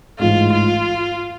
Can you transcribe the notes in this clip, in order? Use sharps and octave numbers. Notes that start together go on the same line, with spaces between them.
A1 G#2 G#3 F4
F4